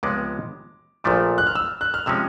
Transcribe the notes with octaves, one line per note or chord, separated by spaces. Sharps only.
C#2 C3 F3 G#3 B3 D6
A#1 A#2 F3 A3 D6
F#6
F6
E6
F#6
F6
C3 F3 G#3 C#4 E6